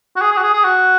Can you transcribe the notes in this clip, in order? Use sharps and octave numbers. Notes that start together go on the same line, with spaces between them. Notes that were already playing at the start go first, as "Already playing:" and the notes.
F#4
G#4
G#4
F#4
G#4
G#4
F#4